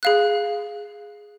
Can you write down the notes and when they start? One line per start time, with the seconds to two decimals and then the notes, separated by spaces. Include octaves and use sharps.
0.03 G#4 F5 F#6